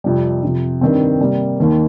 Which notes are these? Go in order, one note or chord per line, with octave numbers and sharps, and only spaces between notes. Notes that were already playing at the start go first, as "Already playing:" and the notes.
F2 C3 G3
F2 C3 F3
G2 D#3 G3 C4
C3 G3 A#3
D#2 D#3 A#3